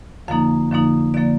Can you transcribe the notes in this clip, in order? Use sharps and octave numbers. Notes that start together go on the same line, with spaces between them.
F2 D3 F3 A#3 D#4 F5
F2 D3 F3 A#3 D#4
D3 F3 A#3 D5